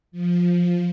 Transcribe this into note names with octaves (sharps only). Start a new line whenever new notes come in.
F3